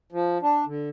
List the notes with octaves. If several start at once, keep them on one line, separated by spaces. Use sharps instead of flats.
F3
D4
D3